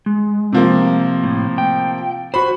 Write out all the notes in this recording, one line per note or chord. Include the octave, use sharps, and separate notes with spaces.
G#3
C3 F3 A#3
A2
G5
F#4 C5 B5